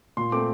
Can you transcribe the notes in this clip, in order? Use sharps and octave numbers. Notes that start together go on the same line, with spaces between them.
A#2 C6
A3 C4 D6